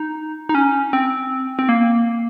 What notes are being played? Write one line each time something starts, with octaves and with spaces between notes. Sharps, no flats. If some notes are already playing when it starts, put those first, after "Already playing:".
Already playing: D#4
D#4
C#4
C4
C4
A#3